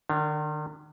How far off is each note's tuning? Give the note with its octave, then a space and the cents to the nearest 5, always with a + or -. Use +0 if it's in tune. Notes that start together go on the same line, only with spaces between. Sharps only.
D#3 -40 D4 +0 A#5 +0